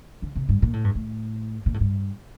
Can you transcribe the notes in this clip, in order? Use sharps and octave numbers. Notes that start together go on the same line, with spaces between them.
D3
C3
G2
A#2
A2
G2
A2
A#2
A2
G2